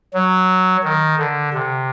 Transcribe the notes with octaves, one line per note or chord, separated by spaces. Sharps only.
F#3
D#3
D3
C3